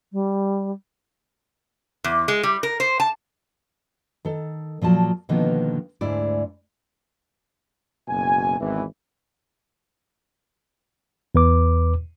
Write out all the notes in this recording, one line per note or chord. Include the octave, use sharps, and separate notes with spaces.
G3
E2
G#3
G3
A#4
C5
A5
D#3 A4
A#2 F3 F#3 A5
B2 D3 D#3 F3 A#3 B3
D2 G#2 G#3 E4 D5
F#1 B2 G#5
G#1 E2 E3
E2 B4 D6